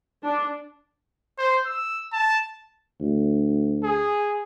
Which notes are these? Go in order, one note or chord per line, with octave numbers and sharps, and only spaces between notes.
D4
C5
E6
A5
D2
G#4